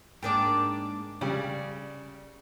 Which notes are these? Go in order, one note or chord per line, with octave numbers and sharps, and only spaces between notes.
G#2 A#3 D4 G5 A5 D6
C#3 G3 D5